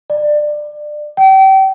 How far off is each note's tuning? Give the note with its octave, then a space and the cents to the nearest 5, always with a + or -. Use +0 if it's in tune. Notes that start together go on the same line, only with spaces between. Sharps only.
D5 +20
G5 -35